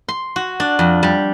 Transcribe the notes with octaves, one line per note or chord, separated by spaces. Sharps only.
C6
F#4
D4
F2
G3